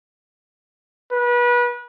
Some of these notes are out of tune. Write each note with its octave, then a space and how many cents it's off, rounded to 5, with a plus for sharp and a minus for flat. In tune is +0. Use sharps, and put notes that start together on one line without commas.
B4 -30